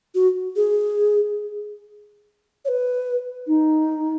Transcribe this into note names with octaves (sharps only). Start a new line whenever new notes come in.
F#4
G#4
C#5
B4
D#4